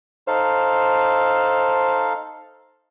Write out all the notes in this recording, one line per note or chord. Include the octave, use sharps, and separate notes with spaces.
D#4 A4 C5 F5